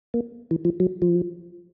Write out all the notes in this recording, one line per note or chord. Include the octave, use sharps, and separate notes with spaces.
A#3
E3
F3
F#3
F3